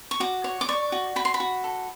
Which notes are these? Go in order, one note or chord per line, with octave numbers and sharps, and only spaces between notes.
C#6
F#4 D6
C#5
D6
D5 C#6
F#4
F#4 B5
C6
B5
F#4
A4